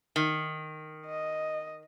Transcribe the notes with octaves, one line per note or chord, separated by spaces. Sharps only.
D#3
D#5